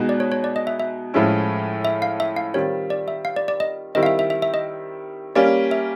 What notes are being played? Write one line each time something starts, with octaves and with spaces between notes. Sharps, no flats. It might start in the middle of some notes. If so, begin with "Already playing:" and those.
Already playing: B2 G#3 B3 D#4 F#4
D5
C#5
C#5
D5
D#5
E5
E5
A2 F3 G#3 C#4 E4
E5
F5
E5
F5
D#3 G3 C4 F4 C#5
D5
E5
F5
D5
D5
D#5
D#3 G3 C4 E4 D#5
F5
E5
E5
E5
E5
D#5
G3 A#3 C#4 D5
E5